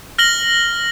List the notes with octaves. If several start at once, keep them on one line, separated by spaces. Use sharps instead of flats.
F6 A#6 F#7 G7